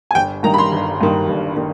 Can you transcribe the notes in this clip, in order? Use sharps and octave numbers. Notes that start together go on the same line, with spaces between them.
G#5
G1 G5
G2 D#3 A#5
B5
C6
G1
G2 D#3
G1
D#3